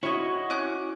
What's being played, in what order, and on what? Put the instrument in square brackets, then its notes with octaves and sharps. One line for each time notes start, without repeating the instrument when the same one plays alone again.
[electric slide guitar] E4 F#4 [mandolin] C#5 D#5
[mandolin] C#4 D6 F#6